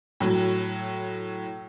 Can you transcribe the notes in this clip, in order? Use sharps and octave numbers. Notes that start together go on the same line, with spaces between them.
A2 F#3